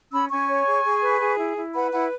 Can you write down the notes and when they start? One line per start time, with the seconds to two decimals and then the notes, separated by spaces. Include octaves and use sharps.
0.12 C#4 B5 E6
0.30 C#4 G#5 C#6
0.48 C#5
0.66 G#4
0.85 G#4
1.03 B4
1.20 G#4
1.39 E4
1.57 E4
1.75 B4 F#5 B5
1.92 E4 F#5 B5